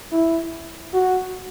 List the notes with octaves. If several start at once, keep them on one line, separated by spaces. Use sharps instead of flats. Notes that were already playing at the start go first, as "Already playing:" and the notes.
E4
F#4